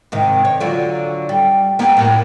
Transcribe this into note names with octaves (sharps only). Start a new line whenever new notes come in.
G#2 C3 D#3
C#5
D3 F#3 F4
G3
A#3 B3 G4
A2 A#3